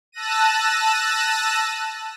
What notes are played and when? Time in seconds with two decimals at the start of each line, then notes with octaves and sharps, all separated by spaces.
0.12 A5 E6 F#6 A#6 D#7